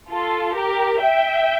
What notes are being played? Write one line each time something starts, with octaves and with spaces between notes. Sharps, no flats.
F4 A4
G4 A#4
E5 G5